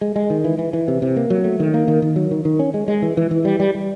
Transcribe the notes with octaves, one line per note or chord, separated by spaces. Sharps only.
G#3
G#3
D#3
E3
E3
E3
C3
C3
A#3
F#3
A3
D#3
A#3
D#3
D#3
F#3
D#3
D#3
C#4
G#3
G#3
E3
E3
E3
G3
G3
G3